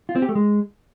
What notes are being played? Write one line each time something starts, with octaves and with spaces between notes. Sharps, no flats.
F4
C4
G4
A3
G#3